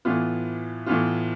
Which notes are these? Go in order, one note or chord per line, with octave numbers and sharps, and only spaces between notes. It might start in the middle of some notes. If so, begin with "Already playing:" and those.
A2 E3 B3 F4
A2 E3 B3 F4